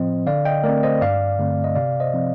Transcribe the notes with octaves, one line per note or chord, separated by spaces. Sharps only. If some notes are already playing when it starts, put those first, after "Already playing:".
Already playing: A2 F3 C4 C5 D#5
D3 D5 F5
D#5 G5
A3 C4 A#4 D5
C5 D#5
G2 D5 F5
D3 A3 C4
D#5
C3 D5 F5
C5 D#5
F3 C4